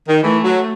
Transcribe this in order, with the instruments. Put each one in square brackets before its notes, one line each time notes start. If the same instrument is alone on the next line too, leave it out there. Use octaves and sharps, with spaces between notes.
[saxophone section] D#3
[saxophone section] E3 [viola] A3
[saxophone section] F#3